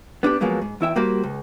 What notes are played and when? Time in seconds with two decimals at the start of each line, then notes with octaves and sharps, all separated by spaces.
0.23 B3 D4 D#4 G4
0.41 F3 F#3 G#3 A#3 B3
0.62 G#2
0.81 E2 E4 E5 G5
0.96 G3 A#3 F#4 G4 C5
1.23 C#2